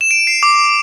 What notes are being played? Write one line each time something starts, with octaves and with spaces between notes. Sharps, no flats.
E7
D7
C7
D6